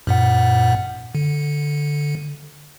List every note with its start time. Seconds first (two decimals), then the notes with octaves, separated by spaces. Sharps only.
0.07 F#2 A#2 F#5
1.15 D3